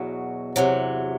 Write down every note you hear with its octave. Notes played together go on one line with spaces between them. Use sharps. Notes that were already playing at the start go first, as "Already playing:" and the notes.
Already playing: E2 B2 F#3
E2 C3 F#3